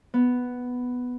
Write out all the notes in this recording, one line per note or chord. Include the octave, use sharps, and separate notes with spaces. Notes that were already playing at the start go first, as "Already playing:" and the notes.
B3